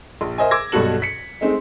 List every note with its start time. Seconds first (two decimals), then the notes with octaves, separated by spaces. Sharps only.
0.21 A#1
0.38 A#4 C5 D#5 E5 G#5
0.51 D6 E6 G#6 A#6
0.72 B1 G2 B2 F#4 A4 F#7
1.02 B6 C#7
1.41 G#3 A3 C4 D#4